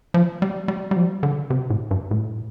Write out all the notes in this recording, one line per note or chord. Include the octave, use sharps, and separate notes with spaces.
F3
G3
G3
G3
F3
D3
C3
A2
G2
A2